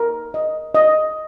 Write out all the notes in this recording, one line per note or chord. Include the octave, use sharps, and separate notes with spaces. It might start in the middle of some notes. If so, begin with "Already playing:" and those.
Already playing: A#4
D#5
D#5